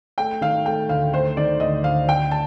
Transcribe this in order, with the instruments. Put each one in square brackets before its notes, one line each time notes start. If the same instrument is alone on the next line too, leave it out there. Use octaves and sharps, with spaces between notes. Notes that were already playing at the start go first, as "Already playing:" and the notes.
[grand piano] A3 [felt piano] G5
[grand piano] D#3 [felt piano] F5
[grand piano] A3 [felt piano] G5
[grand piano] D2 [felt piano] F5
[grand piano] A3 [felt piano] C5
[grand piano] D#3 [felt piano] D5
[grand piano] D2 [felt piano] D#5
[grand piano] D2 [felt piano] F5
[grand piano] D2 [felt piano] G5
[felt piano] A5